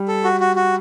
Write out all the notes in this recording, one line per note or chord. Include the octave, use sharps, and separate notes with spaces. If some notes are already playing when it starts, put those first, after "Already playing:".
Already playing: G3
A4
F#4
F#4
F#4